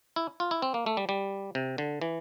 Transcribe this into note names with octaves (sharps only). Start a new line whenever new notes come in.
E4
F4
E4
C4
A#3
A3
G3
G3
C3
D3
E3